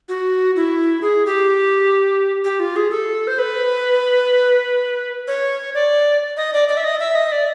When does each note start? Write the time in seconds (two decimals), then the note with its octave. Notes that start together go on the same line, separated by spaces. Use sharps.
0.09 F#4
0.56 E4
1.02 G#4
1.26 G4
2.45 G4
2.60 F4
2.76 G#4
2.91 A4
3.27 C5
3.39 B4
5.28 C#5
5.74 D5
6.37 D#5
6.53 D5
6.69 D5
6.77 E5
6.84 D#5
7.00 E5
7.15 D#5
7.32 D5